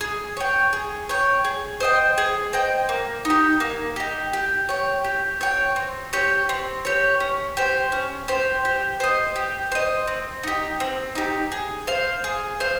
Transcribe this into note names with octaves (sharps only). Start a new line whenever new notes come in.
G#4
C#5 G5
G#4
C#5 G5
G#4
C5 D#5 G5
G#4
C5 D#5 G5
A#3
D#4
G4
A#3
D#4 G4
G4
C#5 G5
G4
C#5 G5
C4
G4 C#5
C4
G4 C#5
C#4
G4 C5
C#4
G4 C5
G4
C5 D#5
G4
C5 D#5
C4
D#4 G4
C4
D#4 G4
G#4
C5 F5
G#4
C5 F5